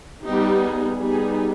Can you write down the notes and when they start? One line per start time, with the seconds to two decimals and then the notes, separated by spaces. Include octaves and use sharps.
0.25 G3 B3 D#4 G4
0.62 G#4
1.00 G3 B3 D#4 G#4